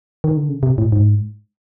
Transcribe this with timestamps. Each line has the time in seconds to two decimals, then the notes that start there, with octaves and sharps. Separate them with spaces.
0.24 D#3
0.37 D3
0.49 C#3
0.63 C3
0.78 A2
0.92 G#2